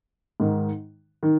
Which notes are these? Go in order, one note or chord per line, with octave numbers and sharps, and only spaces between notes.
G#2 D#3
D#3